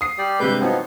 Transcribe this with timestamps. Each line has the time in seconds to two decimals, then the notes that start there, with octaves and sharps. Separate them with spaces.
0.01 D#6 C7
0.18 G3 G4 D5
0.40 G2 C3 G#3 B4 G6
0.61 F3 F#3 B3 C4 D#4